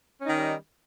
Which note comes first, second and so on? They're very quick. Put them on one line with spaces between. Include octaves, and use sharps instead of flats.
C#4 D#4 D#3 G3